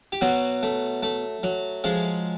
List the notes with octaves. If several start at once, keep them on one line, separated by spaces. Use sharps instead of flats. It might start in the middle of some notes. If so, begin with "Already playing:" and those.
G4
B2 F#3 F#4
A3
A3
F#3
F3 G#3 G#4